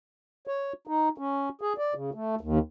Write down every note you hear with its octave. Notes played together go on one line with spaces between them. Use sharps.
C#5
D#4
C#4
G#4
D5
C#3
A3
D#2